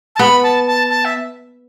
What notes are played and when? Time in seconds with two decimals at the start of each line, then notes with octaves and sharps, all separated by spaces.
0.16 A5
0.19 B3 B5
0.43 A5
0.67 A5
0.90 A5
1.05 E5